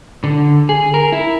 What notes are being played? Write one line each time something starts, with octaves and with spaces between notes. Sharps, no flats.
D3
G#4
A#4
E4